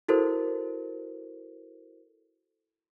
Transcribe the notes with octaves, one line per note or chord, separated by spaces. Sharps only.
E4 F#4 A4 A#4 C5